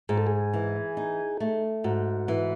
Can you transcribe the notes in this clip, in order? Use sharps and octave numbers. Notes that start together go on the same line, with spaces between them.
G#2 G#4
A4
G#4
E3
D#4
A3
G#2 F#4
E3